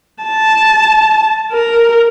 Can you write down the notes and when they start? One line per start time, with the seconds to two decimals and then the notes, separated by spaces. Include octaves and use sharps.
0.24 A5
1.52 A#4